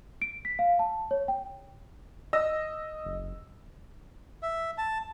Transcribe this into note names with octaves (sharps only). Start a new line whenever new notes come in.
D7
B6
F5
A5
C#5
G5
D#5 E6 A#6
F#1
E5
A5